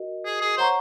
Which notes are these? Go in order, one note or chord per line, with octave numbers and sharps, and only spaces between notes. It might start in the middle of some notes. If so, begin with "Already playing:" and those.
Already playing: F#4 A#4 D#5
G#4
G#4
C5 C#5 F#5 A#5 C#6